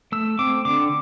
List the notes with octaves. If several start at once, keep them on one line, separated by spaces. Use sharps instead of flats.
A3 E6
C4 D6
D3 D6